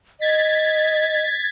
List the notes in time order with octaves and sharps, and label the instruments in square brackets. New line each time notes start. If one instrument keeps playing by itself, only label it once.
[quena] D#5 [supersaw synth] G#6 A6 B6